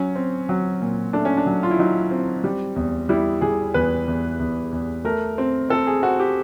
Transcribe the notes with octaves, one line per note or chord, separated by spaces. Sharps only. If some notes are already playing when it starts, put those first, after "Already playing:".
Already playing: F#3 C#4
C4
F#3
A#2
A3 D4
C#4
D4
F#3
F4
E4
F#3 D#4
C4
G3
E2
G3 E4
G3 G#4
E2 B4
E2
E2
E2
A3 A#4
C4
C4 A4
G#4
C4 F#4
G4